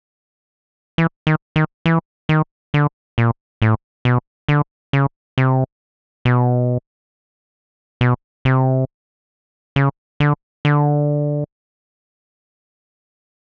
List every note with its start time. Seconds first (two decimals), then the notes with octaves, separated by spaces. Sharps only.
0.98 E3
1.27 D#3
1.56 D#3
1.86 E3
2.29 D#3
2.74 D3
3.18 A#2
3.62 A2
4.05 B2
4.48 D3
4.93 C#3
5.38 C3
6.25 B2
8.01 B2
8.45 C3
9.76 C#3
10.20 D3
10.65 D3